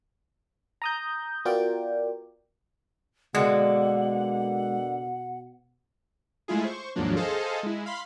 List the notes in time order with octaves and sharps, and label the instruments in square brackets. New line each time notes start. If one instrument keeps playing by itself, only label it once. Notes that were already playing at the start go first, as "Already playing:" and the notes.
[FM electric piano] A#5 D#6 G6
B3 F4 F#4 A#4 D5 G5
[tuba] B2 [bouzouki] D3 A#3 [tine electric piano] G#3 [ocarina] F#5
[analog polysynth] G#3 A3 E4 F4 G#4
C5 C#6
D#2 G#2 F3 F#3 A#3 D4
G#4 A4 C5 D#5 F5 A5
G#3 E4
F5 B5 C6